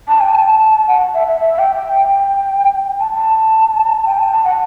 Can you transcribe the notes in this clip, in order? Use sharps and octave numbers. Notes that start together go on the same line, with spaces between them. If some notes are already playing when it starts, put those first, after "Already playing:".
A5
G5
A5
F#5
E5
E5
E5
G5
G5
G5
A5
A5
G5
A5
A5
F#5